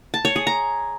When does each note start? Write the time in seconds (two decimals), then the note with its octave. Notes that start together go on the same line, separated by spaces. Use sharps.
0.14 A5
0.25 C#5
0.36 G#4
0.47 A#5